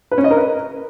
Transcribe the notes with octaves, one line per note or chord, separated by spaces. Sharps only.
B4
C#4
D#5
A#4
B4